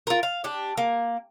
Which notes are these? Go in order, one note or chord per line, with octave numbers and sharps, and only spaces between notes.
F4 A#4
F5
D4 G4
A#3